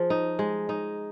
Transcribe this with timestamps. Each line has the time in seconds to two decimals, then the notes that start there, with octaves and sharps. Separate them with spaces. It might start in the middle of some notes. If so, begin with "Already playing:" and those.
Already playing: F3 G#4
0.10 D#4
0.39 G#3
0.69 D#4